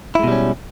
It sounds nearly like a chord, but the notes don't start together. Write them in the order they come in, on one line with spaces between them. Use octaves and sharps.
E4 G#3 B2 G3 C#4